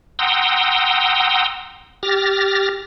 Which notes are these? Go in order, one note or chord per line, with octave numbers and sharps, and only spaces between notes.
F#5 G5 A#5 C6 D#6 E6
G4 F6 A6 A#6